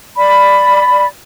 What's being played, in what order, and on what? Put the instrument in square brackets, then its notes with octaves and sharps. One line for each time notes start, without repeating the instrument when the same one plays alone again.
[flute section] D5 B5